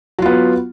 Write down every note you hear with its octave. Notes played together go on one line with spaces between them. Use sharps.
F#3 B3 F4